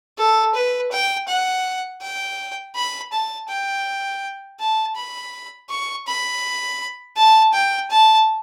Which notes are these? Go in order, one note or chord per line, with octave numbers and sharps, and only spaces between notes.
A4
B4
G5
F#5
G5
B5
A5
G5
A5
B5
C#6
B5
A5
G5
A5